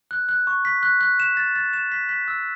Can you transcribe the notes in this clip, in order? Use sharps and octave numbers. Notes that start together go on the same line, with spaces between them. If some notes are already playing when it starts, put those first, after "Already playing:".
F#6
F#6
C#6
B6
F#6
F#6
E7
A6
A6
E7
B6
B6
E6